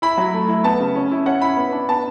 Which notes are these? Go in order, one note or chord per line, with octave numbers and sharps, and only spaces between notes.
E4 B5
F#3
A3
E4
B3 A5
C#3
C#4
E4
C#4 F#5
E4 B5
B3
D4
B3 A5